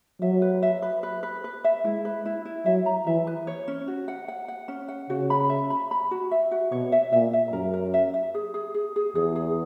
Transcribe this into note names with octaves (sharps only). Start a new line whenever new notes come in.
F#3 E5
B4
E5
B4
B4
B4
B4
E5
G#3 E4
B4
E4
E4
F#3 E5
A#5
E3 E5
B4
C#5
C#4
F#4
F#5
F#5
F#5
C#4
F#5
C#3 F#4
B5
E5
B5
B5
F#4
E5
F#4
B2 C#5
E5
A#2 E5
E5
F#2 A#4
A#4
E5
E5
G#4
G#4
G#4
G#4
E2 G#4
G#4